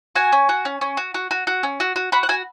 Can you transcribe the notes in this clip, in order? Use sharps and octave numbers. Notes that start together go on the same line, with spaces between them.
F#4 G#5
C#4
F#4
C#4
C#4
F#4
F#4
F#4
F#4
C#4
F#4
F#4
F#4 B5
F#5
F#4 G#5